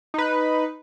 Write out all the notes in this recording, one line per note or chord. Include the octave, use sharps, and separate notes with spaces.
D#4 B4